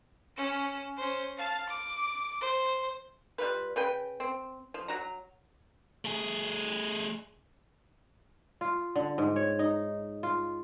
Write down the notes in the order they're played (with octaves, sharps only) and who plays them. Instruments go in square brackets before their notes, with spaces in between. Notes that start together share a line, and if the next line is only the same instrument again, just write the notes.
[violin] C#4 E7
C#4 C5
F5 A5
D6
C5
[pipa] G3 F4 B4
C#3 B4 G5
C4
F3
F#3 F#4 A#5
[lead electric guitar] A3 G#4
[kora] F4
D3
G#2
C#5
D#4
F4